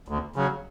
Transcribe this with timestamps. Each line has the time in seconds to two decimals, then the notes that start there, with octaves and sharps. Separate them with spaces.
0.08 D2
0.36 C#3 F#3